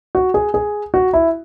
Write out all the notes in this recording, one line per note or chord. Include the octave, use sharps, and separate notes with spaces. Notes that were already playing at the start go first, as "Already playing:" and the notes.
F#4
G#4
G#4
F#4
E4